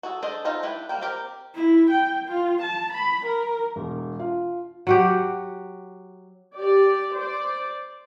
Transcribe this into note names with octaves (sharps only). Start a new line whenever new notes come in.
F#4 G#4 A4
D4 G#4 A4 C5 D#5
B3 D#4 F4 A4 C5
D4 E4 G4 B4
G3 A#3 G5
C4 G4 A#4
E4
G5
F4
A5
B5
A#4
E1
F4
F#3 F#4 G4
G4 D5
C5 D5